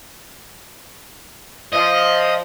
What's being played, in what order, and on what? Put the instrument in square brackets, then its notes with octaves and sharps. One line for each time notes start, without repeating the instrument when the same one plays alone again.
[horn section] F3 [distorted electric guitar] D#5